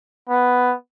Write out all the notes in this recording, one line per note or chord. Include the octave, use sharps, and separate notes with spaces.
B3